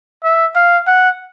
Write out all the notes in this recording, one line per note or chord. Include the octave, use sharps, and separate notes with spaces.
E5
F5
F#5